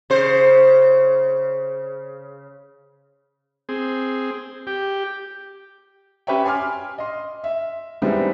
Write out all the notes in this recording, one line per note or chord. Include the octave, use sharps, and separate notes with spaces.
C#3 C5
C4 G#4
G4
C#4 G4 B4 C#5 E5 G5
G#5 C6 D6 F6
D#5 C6
E5
G3 G#3 B3 C4 D#4 E4